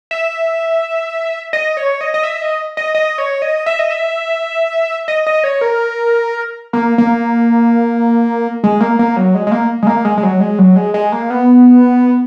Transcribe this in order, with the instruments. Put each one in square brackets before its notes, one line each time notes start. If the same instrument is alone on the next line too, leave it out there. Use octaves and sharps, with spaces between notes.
[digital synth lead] E5
D#5
C#5
D#5
D#5
E5
D#5
D#5
D#5
C#5
D#5
E5
D#5
E5
D#5
D#5
C#5
A#4
A#3
A#3
G#3
A#3
A#3
F#3
G#3
G#3
A#3
G#3
A#3
G#3
G#3
F#3
G#3
F#3
G#3
G#3
A#3
B3